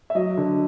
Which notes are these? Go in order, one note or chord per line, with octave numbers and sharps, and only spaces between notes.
E5
F#3 D#5
D3